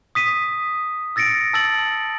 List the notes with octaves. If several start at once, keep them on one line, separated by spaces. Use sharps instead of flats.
D#6 B6 D#7
E6 A6 A#6 C#7 D7
A5 E6 A6 F#7